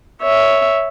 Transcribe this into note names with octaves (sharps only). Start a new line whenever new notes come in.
C#5 E5